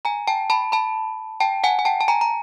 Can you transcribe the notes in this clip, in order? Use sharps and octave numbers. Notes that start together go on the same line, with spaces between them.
G#5 A#5
G5 A5
A5 B5
A5 B5
G5 A5
F#5 G#5
G#5
G5 A5
A5
G#5 A#5
A#5